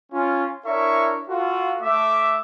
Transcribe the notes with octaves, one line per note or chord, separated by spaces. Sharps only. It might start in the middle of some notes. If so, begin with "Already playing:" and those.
C#4 F4
D4 E4 A#4 C#5 E5 C#6
F4 F#4 A4
A3 E5 D6